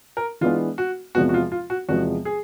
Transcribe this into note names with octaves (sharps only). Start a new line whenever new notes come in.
A#4
E3 G#3 B3 D4 F4
F#4
E2 C3 F3 G#3 B3 F#4
F#4
F4
F4
F#4
E2 C3 F3 G#3 B3 F#4
G#4